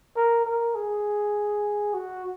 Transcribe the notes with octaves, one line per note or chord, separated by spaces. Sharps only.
A#4
A#4
G#4
F#4